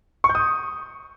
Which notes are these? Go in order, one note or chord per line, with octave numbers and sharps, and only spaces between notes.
C#6
G6
D#6